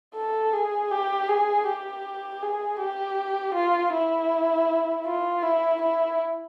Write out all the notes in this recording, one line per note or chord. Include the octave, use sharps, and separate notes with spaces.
A4
G#4
G4
G#4
G4
G#4
G4
F4
E4
F4
E4
E4